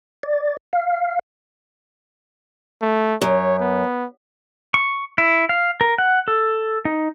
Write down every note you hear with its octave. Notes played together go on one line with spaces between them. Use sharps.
D5
F5
A3
F#2 C#5
B3
C#6
E4
F5
A#4
F#5
A4
D#4